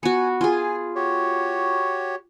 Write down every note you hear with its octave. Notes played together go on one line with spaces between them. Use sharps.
B3 F#4 G#5
F4 G#4 G#5
F#4 G4 C#5